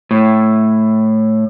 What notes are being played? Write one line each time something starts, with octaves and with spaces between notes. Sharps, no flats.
A2